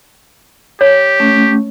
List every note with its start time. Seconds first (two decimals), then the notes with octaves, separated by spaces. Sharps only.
0.81 G4 C#5
1.20 A3 C#4